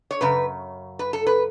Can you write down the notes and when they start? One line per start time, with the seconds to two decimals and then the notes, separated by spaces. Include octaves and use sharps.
0.11 C#5
0.21 F#2 C#3 B4
0.99 B4
1.13 A4
1.27 B4